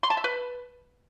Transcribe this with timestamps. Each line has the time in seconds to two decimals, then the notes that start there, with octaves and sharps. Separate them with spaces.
0.03 C6
0.10 A5
0.17 E5
0.24 B4